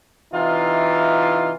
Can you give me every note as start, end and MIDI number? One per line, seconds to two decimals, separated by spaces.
0.33 1.52 48
0.33 1.52 52
0.33 1.52 63
0.33 1.52 65